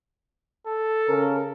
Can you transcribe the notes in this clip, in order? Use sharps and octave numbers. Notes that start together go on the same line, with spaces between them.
A4
C#3 C#4 A#4